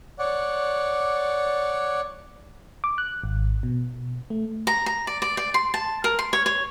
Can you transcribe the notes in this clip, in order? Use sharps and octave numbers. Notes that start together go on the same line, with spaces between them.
C#5 D5 F#5
D6
F#6
G#1
B2
A3
A#5
A#5
D5
D5
D5
C6
A5
A#4
C6
C#5
C#5